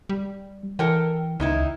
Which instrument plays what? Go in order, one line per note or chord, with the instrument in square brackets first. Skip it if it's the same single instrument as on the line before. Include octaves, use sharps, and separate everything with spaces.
[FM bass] G3
[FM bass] E3 [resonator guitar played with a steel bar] A4 A#4 G5
[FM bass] C#2 [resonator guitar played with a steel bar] D#3 D#4 E4